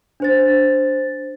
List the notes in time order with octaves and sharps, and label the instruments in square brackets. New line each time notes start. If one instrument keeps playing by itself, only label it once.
[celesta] D4 C5 A6